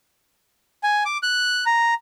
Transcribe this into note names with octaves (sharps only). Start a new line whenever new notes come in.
G#5
D6
F#6
A#5